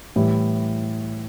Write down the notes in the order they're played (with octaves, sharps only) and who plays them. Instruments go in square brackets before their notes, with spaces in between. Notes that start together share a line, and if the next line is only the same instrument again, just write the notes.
[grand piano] A2 E3 G3 E4